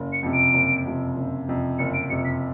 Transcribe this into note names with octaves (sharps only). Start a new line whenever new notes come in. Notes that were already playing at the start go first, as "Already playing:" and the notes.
Already playing: F#1
C#7
F2 C3
D7
F#1
F2 C3
F#1
F2 C3
F#1 C#7
D7
F2 C3 C#7
B6